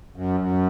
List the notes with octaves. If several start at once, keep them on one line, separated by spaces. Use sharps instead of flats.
F#2
F#2